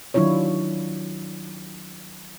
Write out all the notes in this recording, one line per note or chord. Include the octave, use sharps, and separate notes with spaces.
D#3 F#3 D4 E4 F4 C#5